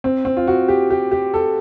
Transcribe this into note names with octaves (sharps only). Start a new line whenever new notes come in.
C4
C4
F4
F#4
G4
G4
G4
A4